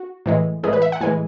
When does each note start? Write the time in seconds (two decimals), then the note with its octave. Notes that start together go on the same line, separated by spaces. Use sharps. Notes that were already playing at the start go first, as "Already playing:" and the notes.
Already playing: F#4
0.26 A2 E3 G#3
0.63 A2 E3 G#3 G#4
0.73 B4
0.82 E5
0.92 F#5
1.01 A2 E3 G#3 G#5